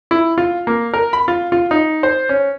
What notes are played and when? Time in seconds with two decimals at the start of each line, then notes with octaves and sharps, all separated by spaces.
0.11 E4
0.38 F4
0.67 A#3
0.93 A#4
1.13 B5
1.28 F4
1.52 F4
1.71 D#4
2.03 C5
2.29 C#4